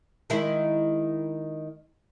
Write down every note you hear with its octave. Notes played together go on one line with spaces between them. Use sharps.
D#3 G#3 E4